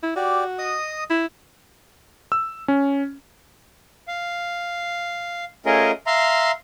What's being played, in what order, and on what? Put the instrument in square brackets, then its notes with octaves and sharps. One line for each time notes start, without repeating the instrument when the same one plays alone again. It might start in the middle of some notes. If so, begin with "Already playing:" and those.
[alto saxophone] E4
[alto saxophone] F#4 [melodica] G4 D5
[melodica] D#5 D#6
[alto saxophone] E4
[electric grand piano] E6
C#4
[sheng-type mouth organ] F5
A3 C#4 F4 G#4 A#4 D#5
E5 F5 A#5 C6